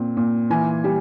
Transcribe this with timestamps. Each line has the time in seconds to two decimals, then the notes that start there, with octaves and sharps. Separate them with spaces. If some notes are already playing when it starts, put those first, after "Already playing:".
Already playing: A#2 C4
0.17 A#2
0.50 E3 G#5
0.84 G3